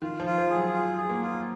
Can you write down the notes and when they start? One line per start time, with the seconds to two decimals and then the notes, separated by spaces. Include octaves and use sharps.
0.02 D#3 F4
0.20 F3
0.26 F4
0.38 F3
0.50 G#4
0.56 F#3
0.73 F4
0.97 G#4
1.09 A#3
1.21 F4